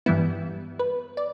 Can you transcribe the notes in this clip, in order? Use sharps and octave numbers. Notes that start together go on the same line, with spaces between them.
G2 E3 G3 B3 E4
B4
D5